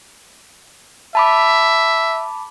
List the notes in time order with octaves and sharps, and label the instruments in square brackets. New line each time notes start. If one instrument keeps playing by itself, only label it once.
[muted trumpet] E5 [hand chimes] A5 B5 D6